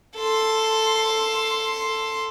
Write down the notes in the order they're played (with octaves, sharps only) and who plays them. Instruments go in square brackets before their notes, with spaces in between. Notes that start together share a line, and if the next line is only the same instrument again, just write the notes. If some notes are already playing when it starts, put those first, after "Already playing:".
[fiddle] A4 C6